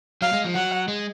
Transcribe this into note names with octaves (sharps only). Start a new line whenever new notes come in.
F#3 F5
G#3
F3
F#3 F#5
G#3